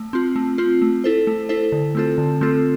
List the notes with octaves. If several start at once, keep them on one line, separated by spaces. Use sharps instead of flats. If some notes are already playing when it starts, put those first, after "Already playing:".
Already playing: A3
C4 F4
A3
C4 F4
A3
E4 A4 C5
A3
E4 A4 C5
D3
A3 C4 F4 A4
D3
A3 C4 F4 A4